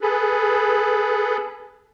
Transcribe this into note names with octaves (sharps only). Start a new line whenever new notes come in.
G#4 A4 B4